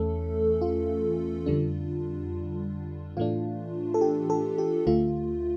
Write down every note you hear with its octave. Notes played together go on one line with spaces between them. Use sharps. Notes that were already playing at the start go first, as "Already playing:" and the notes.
Already playing: E2 E3 A3 C#4 A4
F4
F2 D3 G3 D4
A2 E3 A3 D4 F4
A4
G4
A4
G4
D2 D3 A3 F4